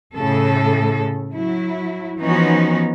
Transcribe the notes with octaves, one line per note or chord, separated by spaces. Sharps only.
A2 C#3 A4
F#3 E4
E3 F3 B3 C#4 D#4 F#4